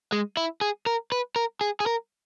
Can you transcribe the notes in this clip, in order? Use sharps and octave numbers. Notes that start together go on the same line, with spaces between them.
G#3
E4
G#4
A#4
B4
A#4
G#4
G#4
A#4